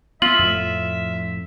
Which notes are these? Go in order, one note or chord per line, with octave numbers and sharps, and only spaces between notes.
B3 F4 E5 F#7
F2 A2